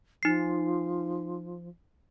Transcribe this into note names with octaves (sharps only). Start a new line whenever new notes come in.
F3 D#4 C7